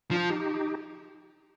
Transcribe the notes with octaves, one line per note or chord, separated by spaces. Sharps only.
F3 D4 F4
D#4 G4